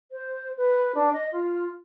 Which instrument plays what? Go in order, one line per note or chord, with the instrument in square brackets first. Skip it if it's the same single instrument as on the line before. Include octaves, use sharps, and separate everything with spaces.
[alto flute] C5
B4
D4
D#5
F4